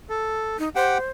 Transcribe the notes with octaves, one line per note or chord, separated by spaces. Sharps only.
A4
D#4
G4 C5 F#5 G5